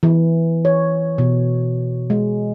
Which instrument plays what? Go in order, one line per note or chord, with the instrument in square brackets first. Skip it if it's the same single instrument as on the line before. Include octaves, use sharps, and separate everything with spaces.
[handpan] E3
C#5
B2
G#3